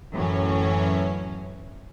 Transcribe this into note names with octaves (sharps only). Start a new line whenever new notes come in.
F#2 A2 E3 F#3 C#4